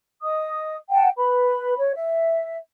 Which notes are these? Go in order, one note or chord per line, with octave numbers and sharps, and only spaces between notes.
D#5 D#6
F#5 G5 A5
B4 B5
C#5
E5